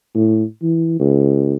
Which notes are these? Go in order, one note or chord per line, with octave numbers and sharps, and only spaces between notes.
A2
E3
C#2